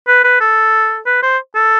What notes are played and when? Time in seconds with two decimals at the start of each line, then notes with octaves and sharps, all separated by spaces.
0.07 B4
0.24 B4
0.40 A4
1.06 B4
1.23 C5
1.55 A4